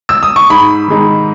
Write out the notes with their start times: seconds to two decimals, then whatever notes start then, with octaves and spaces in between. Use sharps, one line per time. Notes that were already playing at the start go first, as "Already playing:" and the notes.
0.09 E6
0.23 D#6
0.36 C#6
0.50 G#2 B5
0.88 D#3 G#3 D#4